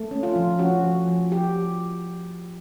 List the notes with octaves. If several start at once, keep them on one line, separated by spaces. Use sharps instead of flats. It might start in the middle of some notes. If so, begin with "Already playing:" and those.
Already playing: A3
C#4
F4
F3
C#4 F#4
F3
F3
F3 G4